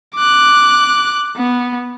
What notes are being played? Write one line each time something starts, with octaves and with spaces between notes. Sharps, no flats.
D6 F#6
B3